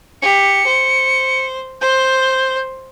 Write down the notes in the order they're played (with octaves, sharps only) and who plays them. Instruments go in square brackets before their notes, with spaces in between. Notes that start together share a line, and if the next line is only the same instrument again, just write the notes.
[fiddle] G4 [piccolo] C#7
[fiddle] C5
[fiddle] C5 [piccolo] G6